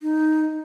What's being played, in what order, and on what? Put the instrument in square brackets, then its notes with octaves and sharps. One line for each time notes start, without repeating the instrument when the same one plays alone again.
[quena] D#4